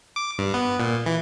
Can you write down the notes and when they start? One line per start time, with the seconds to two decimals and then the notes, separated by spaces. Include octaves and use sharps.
0.16 D6
0.39 G2
0.54 B3
0.80 A#2
1.06 E3